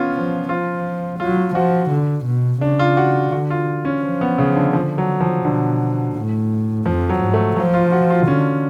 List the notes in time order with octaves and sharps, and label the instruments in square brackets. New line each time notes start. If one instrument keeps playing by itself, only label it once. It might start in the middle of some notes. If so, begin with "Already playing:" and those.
Already playing: [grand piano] B3 C#4 F4
[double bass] F3
[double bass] F3 [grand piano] F4
[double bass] F#3 [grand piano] F4
[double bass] F3 [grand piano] F#4
[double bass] D3
B2
[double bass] C#3 [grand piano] D4
[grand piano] F4
F#4
[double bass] D3 [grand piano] F#4
[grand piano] F4
C#4
[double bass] F3
[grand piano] B3
C#3
D3
[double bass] D3 [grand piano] F3
[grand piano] F#3
F3
[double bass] B2 [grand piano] D3
[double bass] A2
[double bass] F2 [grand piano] F3
[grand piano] F#3
[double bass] G#2
[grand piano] A3
[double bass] F3 [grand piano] F#3
[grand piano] F4
F#4
F4
[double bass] D3 [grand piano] C#4